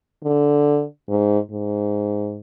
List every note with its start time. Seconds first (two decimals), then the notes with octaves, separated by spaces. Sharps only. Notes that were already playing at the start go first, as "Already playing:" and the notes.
0.24 D3
1.09 G#2
1.51 G#2